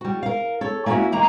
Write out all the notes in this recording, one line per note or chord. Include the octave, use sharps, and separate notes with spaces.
G3 F#4
A#4 F5
A4 C#5
A#3 C#4 D4 E4 F#4
D#3 A#3 A#5